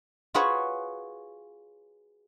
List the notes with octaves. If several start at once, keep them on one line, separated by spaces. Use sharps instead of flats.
F4 F#4 G#4 B4 C#5 F#5